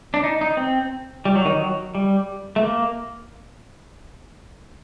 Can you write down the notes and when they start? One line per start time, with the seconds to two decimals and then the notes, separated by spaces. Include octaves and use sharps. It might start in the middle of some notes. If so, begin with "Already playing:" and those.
0.14 D4
0.23 D#4
0.41 D#4
0.57 C4
1.25 G3
1.35 F#3
1.45 D#3
1.55 F#3
1.95 G3
2.56 A3
2.63 A#3